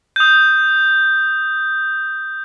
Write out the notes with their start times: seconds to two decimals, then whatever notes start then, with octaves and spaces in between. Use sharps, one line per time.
0.16 D#6 G6